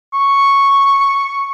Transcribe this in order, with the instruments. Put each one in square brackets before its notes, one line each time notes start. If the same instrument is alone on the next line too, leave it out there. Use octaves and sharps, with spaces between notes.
[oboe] C#6